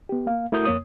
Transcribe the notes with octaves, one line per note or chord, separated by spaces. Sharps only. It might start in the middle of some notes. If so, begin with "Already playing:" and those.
B3 G4
A#3 F5
A3 E4 F#4 A#4 D#6 G6
F2 A#3 C#5 D#6